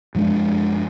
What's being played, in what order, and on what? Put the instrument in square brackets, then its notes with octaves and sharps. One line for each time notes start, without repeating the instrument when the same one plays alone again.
[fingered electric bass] F#2 F3 G#3 D4